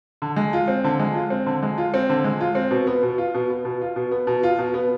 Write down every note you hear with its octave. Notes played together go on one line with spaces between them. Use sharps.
D3
G#3
F4
C4
D3
G#3
F4
C4
D3
G#3
F4
C4
D3
G#3
F4
C4
B2
B3
B2
F4
B2
B3
B2
F4
B2
B3
B2
F4
B2
B3